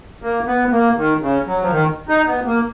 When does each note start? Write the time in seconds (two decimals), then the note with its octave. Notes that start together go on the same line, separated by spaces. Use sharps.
0.22 A#3
0.47 B3
0.71 A#3
0.96 D#3
1.21 C#3
1.46 F#3
1.61 F3
1.71 D#3
2.09 D#4
2.27 B3
2.45 A#3